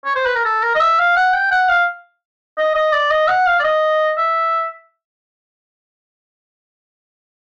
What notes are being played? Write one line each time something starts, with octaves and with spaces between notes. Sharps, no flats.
C#5
C5
B4
A#4
A4
A#4
D#5
E5
F5
F#5
G5
F#5
F5
D#5
D#5
D5
D#5
F#5
F5
D5
D#5
E5